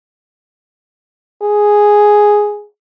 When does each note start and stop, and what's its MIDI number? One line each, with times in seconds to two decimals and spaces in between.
1.42 2.65 68